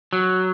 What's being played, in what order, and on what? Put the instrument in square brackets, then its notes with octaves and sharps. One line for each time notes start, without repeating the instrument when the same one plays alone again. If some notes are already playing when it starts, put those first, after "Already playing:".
[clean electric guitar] F#3